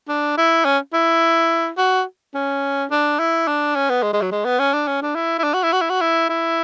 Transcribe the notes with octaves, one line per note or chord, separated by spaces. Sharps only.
D4
E4
C#4
E4
F#4
C#4
D4
E4
D4
C#4
B3
G#3
G#3
F#3
G#3
B3
C#4
D4
C#4
D4
E4
E4
D4
F#4
E4
F#4
E4
F#4
E4
E4